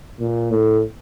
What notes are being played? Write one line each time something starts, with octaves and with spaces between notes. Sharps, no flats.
A#2
A2